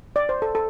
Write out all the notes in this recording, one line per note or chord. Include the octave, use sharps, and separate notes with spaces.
D5
C5
A4
A4